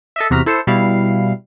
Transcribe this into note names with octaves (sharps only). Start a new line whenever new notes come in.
A4 D#5 E5
E2 C3 F#4 A#5 F6 B6
E4 A4 C5 C#7 E7
B2 G3 E4 F5